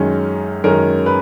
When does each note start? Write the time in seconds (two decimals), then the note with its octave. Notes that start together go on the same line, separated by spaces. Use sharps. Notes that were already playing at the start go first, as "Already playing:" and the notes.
Already playing: F#2 D#3 G#3 C#4
0.64 F#2 D#3 G#3 C#4 A#4
1.06 B4